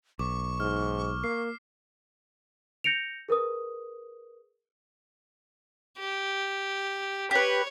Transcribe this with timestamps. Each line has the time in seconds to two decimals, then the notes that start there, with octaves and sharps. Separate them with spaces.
0.19 B1 C#6 D6
0.60 G#2 F6
1.24 A#3 C7
2.84 G6 A#6 C#7 D7 F7
3.28 G#4 A#4 B4 D#6
5.99 G4
7.31 G4 B4 C#5